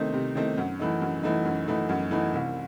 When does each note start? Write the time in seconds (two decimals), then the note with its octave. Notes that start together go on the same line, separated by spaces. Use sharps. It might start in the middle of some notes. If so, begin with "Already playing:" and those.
Already playing: C3 D#3 A3 C4 D#4
0.13 C3
0.35 D#3 A3 C4 D#4
0.57 F#2
0.80 E3 A3 D#4
1.02 F#2
1.23 E3 A3 D#4
1.45 F#2
1.68 E3 A3 D#4
1.89 F#2
2.11 E3 A3 D#4
2.33 C2